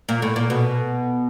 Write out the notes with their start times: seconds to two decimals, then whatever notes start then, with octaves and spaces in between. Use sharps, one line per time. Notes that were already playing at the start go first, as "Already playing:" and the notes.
0.09 A#2
0.22 A2
0.36 A#2
0.50 B2